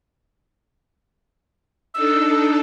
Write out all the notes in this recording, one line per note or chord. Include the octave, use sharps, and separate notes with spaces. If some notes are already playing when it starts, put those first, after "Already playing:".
D4 D#4 A4 E6